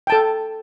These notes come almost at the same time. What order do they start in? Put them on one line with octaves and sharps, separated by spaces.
G5 A5 A4